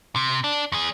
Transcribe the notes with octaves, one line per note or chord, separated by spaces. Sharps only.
C3
D4
E2 G#4